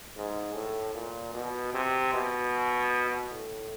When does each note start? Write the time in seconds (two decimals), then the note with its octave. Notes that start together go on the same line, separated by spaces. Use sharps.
0.16 G#2
0.55 A2
0.94 A#2
1.34 B2
1.74 C3
2.14 B2
3.31 A2